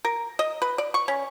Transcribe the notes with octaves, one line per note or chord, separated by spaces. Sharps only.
A#4
D#5
B4
D5
C#6
C#4